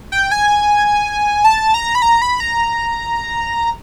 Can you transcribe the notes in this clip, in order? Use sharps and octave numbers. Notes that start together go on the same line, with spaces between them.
G5
G#5
A5
A#5
B5
A#5
B5
A#5